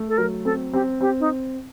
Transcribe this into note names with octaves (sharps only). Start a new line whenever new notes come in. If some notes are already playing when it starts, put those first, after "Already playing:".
Already playing: A3
A4
F#3 A#4
C4 A4
C4 G4
C4 G4
D#4